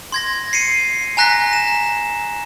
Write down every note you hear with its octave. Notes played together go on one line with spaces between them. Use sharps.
C6 G#6 A#6
C7 C#7 D#7
G#5 A#5 F#6 A#6 B6
E7